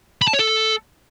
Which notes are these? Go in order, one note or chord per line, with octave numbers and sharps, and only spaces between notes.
B5
A5
C#5
A4